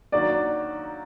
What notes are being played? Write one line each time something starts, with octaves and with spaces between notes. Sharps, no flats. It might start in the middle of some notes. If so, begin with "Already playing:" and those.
D#3 F#3 A#3 D4 F#4 D5